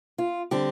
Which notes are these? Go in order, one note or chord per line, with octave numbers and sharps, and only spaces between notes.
F4
D3 G3 C4 G4